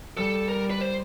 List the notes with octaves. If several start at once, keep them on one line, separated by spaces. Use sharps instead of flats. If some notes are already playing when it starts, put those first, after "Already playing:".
G3 A4
A#4
B4
C5